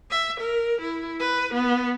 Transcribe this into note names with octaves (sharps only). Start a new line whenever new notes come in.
E5
A#4
E4
B4
B3